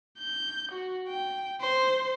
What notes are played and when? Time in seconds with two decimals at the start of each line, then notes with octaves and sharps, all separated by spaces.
0.19 G6
0.72 F#4
1.08 G5
1.61 C5